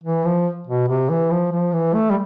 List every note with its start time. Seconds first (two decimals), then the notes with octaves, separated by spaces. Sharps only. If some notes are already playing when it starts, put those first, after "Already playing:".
0.04 E3
0.25 F3
0.67 B2
0.88 C3
1.10 E3
1.31 F3
1.52 F3
1.73 E3
1.94 A3
2.11 G3